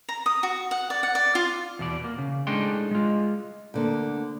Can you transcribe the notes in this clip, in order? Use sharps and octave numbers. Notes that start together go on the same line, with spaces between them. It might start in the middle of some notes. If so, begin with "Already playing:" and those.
A#5
D#6
F#4
F#5
D5
F#5
D5
F4
E2 B2 D5
A#3
C#3
A2 G#3 D4 D#4 G5 C6
G#3 F4
D2 D3 A#3